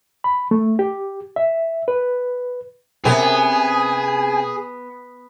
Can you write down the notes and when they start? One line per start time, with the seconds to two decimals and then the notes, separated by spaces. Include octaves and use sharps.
0.24 B5
0.51 A3
0.79 G4
1.36 E5
1.88 B4
3.05 C3 B3 C#4 G#4 A#4 G#5